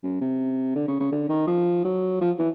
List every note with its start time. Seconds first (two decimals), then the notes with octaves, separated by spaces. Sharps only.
0.03 F#2
0.21 C3
0.75 D3
0.88 C#3
1.00 C#3
1.12 D3
1.29 D#3
1.47 F3
1.85 F#3
2.21 F3
2.39 E3